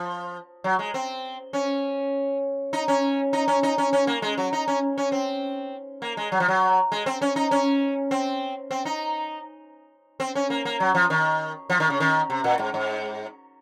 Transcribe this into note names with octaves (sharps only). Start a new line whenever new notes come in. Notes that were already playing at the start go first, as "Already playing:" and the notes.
Already playing: F3
F#3
G#3
C4
C#4
D#4
C#4
D#4
C#4
D#4
C#4
C#4
A#3
G#3
F#3
D#4
C#4
C#4
C4
A#3
G#3
F#3
F3
F#3
G#3
C4
C#4
D#4
C#4
C4
C4
D#4
C4
C#4
A#3
A#3
F#3
F3
D#3
F3
D#3
C#3
D#3
C3
A#2
G#2
G#2